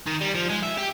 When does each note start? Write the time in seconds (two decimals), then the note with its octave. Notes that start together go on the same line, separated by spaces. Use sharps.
0.06 D#3
0.21 G3
0.34 F3
0.49 G#3
0.63 E5
0.77 G4